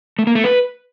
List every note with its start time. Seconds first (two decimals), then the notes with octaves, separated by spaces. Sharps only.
0.19 A3
0.27 A#3
0.35 A3
0.44 B4